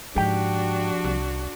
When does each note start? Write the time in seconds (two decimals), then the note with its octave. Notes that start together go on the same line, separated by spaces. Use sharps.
0.16 G#2 F3 D4 F#4 G4 G5
1.04 C2